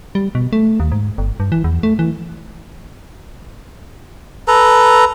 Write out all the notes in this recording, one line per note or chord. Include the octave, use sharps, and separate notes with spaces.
G3
B2
A3
D#2
G#2
G1
G2
E3
E2
A3
E3
A4 B4 A#5